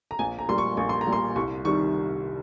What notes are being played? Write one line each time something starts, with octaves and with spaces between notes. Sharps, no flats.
A#5
A#1 G#5
A#5
A#2 G3 C6
C#6
A#1 C#6
C6
A#5
A#2 G3
C6
C2 C#6
C3 D#3 G3 C#6